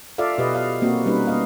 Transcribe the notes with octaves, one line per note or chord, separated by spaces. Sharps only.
F4 A4 D5 E5 F5
B2 G4 B4 D#5
F5
A#3 C4 F#4
G3 C#4 D#4 B4
A#3 B3 D#5 F5